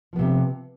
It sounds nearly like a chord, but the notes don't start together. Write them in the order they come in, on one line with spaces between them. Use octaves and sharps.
F3 B3 C3